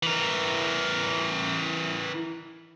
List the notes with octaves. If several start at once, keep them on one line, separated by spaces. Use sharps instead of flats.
E3 A#4